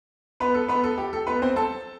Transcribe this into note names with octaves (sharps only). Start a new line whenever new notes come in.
B3 B4
A4
B3 B4
A4
G4
A4
B3 B4
C4 C5
A4 A5